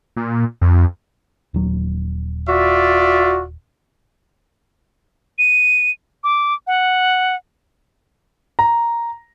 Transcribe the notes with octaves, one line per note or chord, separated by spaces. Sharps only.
A#2
F2
D#1 F#3
F4 F#4 D5 E5
D#7
D6
F#5
A#5